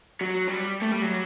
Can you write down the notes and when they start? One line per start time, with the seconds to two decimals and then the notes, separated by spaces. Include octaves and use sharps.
0.21 F#3
0.48 G3
0.82 A3
0.91 G3
1.02 F#3